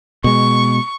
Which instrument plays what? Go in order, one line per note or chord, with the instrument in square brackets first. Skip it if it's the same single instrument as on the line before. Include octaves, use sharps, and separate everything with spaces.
[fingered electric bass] B2 G#3 [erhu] C#6